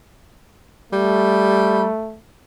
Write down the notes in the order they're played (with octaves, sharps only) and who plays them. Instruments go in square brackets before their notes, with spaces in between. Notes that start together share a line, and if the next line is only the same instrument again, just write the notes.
[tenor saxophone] G3 [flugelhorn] A3